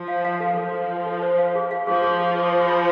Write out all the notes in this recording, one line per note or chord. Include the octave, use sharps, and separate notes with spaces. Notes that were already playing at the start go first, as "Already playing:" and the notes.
Already playing: F3
F5
F5
A4
F3 A4
A4
F5
A4
C5
F5
G#4
F5
F3 G#4
G#4
G#4
C5
C5
B5